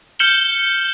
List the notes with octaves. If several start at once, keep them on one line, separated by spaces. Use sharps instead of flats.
F6 G6 C#7 E7 F#7 G7